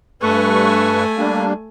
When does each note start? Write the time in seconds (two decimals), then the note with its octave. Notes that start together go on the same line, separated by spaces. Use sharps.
0.22 G2 A3 B4 G#5 C#6
1.17 G3 A#3 D4